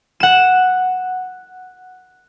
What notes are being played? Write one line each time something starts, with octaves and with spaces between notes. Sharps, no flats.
F#5 E7